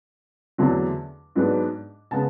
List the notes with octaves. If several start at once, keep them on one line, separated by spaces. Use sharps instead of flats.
E2 D3 F#3 A3 D4
G#2 F#3 B3 D4
C#3 G#3 B3 F#5 A5